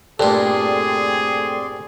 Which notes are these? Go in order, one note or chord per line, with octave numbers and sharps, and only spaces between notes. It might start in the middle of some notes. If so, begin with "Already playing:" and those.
G2 A#2 A3 C4 G#4 A4 D5 C6